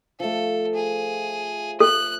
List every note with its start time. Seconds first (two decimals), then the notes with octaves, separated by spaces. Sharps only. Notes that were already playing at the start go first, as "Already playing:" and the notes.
0.20 F3 A3 A4
0.74 G#4
1.80 A4 F#6